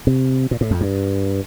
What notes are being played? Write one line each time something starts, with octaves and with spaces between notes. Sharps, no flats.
C3
A#2
A2
F2
G2